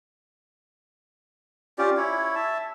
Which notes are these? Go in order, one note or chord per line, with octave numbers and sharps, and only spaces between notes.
C#4 F4 G4 D5
E4 C#5
E5 A5